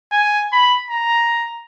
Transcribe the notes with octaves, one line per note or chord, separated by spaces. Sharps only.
G#5
B5
A#5